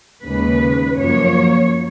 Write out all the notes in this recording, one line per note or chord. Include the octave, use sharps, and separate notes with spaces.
D#2 C#3 G#3 B4
F#2 F3 A#3 C#5